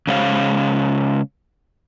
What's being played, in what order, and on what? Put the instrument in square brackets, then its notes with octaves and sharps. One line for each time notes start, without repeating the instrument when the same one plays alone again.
[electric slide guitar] C#3 G#3 C5 C#5 F5